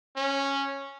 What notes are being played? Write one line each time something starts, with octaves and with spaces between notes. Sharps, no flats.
C#4